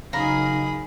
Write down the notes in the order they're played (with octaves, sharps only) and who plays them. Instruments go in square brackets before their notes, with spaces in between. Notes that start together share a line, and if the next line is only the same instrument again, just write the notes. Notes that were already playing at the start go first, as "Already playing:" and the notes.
[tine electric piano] C#3 F5 [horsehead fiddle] F#3 D#4 [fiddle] G#4 B5 [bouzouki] A#4